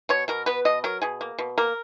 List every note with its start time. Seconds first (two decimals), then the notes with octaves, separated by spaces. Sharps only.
0.09 B2 C#5
0.28 B2 A#4
0.46 B3 B4
0.65 B2 D#5
0.84 F#3 A#4
1.02 B2 G#4
1.21 A#3
1.39 B2
1.58 A#3 A#4